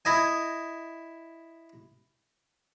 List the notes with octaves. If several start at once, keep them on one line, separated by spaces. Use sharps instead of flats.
E4 D#5 G#5